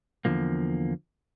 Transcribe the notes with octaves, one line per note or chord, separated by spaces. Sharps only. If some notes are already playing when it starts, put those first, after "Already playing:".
E2 G#2 D3 F3 A#3